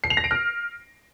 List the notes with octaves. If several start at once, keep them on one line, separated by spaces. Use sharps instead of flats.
C7
F7
A#6
D7
F6